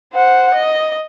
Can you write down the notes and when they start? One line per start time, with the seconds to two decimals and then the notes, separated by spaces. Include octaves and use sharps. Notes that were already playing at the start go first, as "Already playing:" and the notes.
0.13 C5 F#5
0.54 D#5